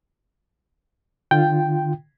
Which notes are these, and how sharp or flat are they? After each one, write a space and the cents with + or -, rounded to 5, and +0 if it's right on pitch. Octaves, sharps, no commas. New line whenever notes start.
D3 +35 F4 +0 G5 +0